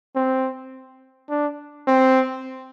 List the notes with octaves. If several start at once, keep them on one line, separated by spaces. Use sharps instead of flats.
C4
D4
C4